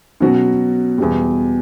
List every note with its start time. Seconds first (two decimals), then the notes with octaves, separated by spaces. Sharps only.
0.21 B2 F#3 C#4 F#4
0.98 E2 B2 G3